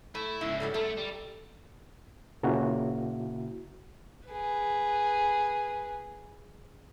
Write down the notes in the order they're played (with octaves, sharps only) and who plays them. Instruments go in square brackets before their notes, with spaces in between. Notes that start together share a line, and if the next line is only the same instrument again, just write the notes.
[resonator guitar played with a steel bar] A3 [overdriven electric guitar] E4
[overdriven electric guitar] G#2 C#3 [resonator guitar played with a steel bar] E4
[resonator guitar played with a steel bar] F#3 G3 A4
[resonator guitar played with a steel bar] F#2 A4 [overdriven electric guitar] A3
[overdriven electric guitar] G3
[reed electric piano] A#2 C#3 A#3 E4 F#4
[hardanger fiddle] G#4 B4